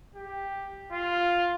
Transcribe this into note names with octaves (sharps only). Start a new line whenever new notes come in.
G4
F4